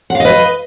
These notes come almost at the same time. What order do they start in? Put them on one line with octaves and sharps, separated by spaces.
F#5 F5 D#5 B4